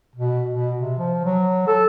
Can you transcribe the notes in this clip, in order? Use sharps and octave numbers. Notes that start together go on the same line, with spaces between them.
B2
B2
C3
F3
F#3
A4